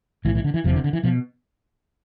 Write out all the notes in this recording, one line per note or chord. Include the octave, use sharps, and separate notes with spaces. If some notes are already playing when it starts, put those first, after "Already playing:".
B1 A2 E3
E3
D3
E3
F1 E2 C3 F3
D3
D3
E3
B2 F3